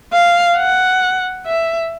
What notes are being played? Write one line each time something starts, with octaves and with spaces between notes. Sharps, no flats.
F5
F#5
E5